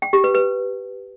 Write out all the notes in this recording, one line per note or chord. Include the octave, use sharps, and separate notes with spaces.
G5
G4
B4
B4